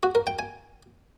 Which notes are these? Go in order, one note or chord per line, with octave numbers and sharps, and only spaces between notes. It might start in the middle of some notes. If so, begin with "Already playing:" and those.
F#4
A#4
G5
G#5